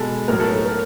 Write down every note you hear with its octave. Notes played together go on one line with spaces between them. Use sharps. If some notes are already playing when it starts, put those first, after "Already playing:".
Already playing: B2 G#3 A4
A2 F#3 A#4
A4
A4
A#4